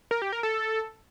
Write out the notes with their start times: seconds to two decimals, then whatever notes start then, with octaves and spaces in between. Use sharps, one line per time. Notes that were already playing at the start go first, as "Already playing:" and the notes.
0.11 A#4
0.22 G4
0.32 A#4
0.43 A4